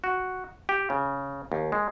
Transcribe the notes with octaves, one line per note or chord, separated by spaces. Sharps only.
F#4
G4
C#3
D#2
G#3